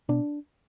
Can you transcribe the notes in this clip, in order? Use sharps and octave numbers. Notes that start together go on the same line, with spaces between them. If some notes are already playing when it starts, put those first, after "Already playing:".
B2 D4